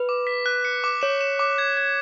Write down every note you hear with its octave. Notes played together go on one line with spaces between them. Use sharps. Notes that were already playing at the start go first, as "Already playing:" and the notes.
Already playing: B4
D6
B6
F#6
C#7
D6
C#5 E7
E7
D6
G#6
G#6